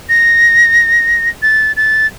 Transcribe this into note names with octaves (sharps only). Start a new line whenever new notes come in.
A#6
A6
A6